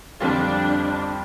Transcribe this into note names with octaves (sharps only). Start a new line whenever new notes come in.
F2 D3 G3 C4 D4 F4